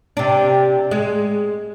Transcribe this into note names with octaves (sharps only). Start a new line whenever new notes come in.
C3 D4
G#3